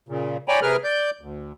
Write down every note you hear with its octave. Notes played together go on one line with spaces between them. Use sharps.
A#2 C#3
C#5 D5 G5 G#5 A#5 B5
C3 G#4 A#4 B4 F6
D5 G6
D2